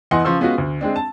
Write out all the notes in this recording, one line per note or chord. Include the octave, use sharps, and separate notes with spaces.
E2 E4 D#5 F#5 G#5 C6
C#3 F3 C6 C#6 E6
G#3 B3 C#4 F4 F#4
D2
G#3 C4 D4
A5